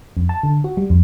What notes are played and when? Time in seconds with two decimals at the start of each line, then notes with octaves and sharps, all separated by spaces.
0.17 F2
0.29 A5
0.43 D3
0.64 F#4
0.77 G3
0.90 F2